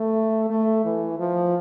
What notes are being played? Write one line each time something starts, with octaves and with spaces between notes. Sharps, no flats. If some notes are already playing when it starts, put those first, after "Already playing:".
Already playing: A3
A3
E3
F3